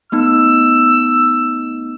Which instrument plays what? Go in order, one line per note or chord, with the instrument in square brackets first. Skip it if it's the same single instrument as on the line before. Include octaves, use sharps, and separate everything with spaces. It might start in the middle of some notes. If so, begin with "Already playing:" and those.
[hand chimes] A3 B3 D#4 [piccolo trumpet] E6